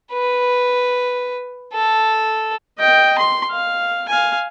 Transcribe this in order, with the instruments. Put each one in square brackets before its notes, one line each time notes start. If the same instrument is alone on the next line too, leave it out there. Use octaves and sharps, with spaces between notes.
[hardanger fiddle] B4
A4
[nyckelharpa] D#5 G5
C6
F5
F5 G#5